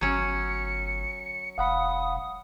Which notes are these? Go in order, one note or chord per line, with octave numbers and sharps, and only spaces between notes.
G1 F#3 C#4 C#7
E1 F5 F#5 B5 D#6